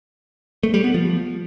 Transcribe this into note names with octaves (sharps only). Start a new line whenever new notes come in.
A3
G3
B3
F3